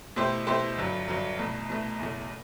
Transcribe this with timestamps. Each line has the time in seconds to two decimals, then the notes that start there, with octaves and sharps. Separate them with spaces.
0.16 B2 A3 E4 G4 C5
0.47 B2 A3 E4 G4 C5
0.78 G1 G2 F#3
1.08 G1 G2 F#3
1.39 C2 B2 A3
1.69 C2 B2 A3
1.99 F#1 E2 B2 A3